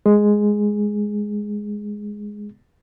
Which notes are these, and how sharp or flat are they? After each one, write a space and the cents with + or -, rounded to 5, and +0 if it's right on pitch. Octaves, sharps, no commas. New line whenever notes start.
G#3 +0 G#4 +0